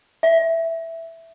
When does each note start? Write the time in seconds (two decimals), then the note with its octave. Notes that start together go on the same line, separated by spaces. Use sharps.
0.23 E5